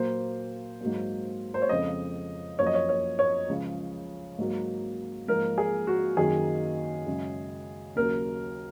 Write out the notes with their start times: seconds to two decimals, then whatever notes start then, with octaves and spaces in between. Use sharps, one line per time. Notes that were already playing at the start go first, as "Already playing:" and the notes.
Already playing: A#2 F#3 A#3 C5
0.81 G#2 F#3 A#3
1.54 C5
1.62 C#5
1.69 F2 C#3 F3 G#3 D#5
2.59 F#2 F3 A#3 C#5
2.66 D#5
2.74 C#5
2.89 C#5
3.19 C#5
3.48 C#2 C#3 F3
4.38 G#2 F#3 A#3
5.28 G#2 F3 A#3 A#4
5.58 G#4
5.87 F#4
6.17 F#2 D#3 F#3 A#3 G#4
7.06 F#2 C#3 G#3
7.96 D#2 C#3 F#3 A#4